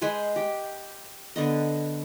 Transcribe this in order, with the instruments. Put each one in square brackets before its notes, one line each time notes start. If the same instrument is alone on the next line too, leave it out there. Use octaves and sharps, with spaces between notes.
[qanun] G#3 B4 C5 G#5
G4
D3 B3 D#5